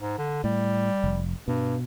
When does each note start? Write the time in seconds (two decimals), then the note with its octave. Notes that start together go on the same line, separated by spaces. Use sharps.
0.01 G#2
0.18 D3
0.44 A2 G3
1.04 F1
1.48 G2 B2